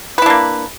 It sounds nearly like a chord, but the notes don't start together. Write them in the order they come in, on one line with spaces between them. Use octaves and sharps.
B4 E4 D4 A#3